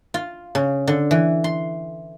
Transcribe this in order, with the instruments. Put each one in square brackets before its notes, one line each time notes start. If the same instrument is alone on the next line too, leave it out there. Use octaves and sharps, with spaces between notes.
[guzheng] F4
C#3
D3
E3
C6